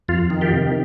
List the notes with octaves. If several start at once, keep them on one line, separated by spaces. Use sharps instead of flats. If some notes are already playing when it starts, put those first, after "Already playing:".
F2 F4
D#3
F4 G4
C3